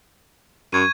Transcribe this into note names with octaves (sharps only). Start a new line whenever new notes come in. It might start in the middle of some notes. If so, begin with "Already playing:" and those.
F#2 C#6 G#6 D#7